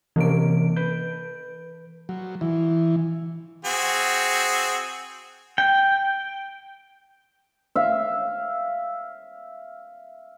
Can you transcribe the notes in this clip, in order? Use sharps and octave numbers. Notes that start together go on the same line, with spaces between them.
C3 E3 A#3 C#4 D7
B4 G6
F#3
E3
C4 F#4 G#4
G5
E5 F5